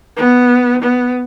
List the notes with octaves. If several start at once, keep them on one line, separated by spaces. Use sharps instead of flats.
B3
B3